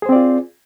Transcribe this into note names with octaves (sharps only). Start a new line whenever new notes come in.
C4 F4 G#4 C5 D5